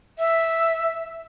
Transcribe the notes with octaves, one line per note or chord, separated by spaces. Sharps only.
E5